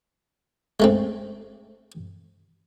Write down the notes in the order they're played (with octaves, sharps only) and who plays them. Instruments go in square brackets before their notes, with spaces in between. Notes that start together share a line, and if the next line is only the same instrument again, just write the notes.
[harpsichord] G#3 A3 C4